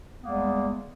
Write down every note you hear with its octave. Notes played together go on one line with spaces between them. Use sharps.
E2 G3 G#3 A#3 B3